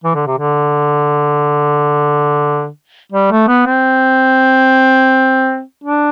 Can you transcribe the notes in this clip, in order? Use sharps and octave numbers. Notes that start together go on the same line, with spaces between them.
E3
D3
C3
D3
G3
A3
B3
C4
D4